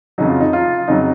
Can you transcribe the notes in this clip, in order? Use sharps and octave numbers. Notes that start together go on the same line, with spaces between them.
F2 C#3 F#3 D#4
F4
D#4
F4
F2 C#3 F#3 D#4